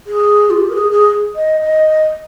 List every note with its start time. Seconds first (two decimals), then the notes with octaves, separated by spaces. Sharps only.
0.06 G#4
0.50 F4
0.58 G4
0.70 A#4
0.75 G#4
0.92 G#4
1.36 D#5
1.61 D#5